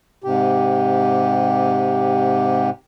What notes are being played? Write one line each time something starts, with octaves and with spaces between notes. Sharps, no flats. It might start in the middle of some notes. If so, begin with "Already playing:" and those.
G#2 C3 G4